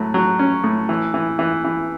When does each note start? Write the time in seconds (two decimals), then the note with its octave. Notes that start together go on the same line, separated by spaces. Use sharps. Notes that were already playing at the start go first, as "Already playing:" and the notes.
Already playing: A2 F#3
0.14 F#3
0.39 C#4
0.64 A2
0.89 E3
1.14 E3
1.39 E3
1.64 E3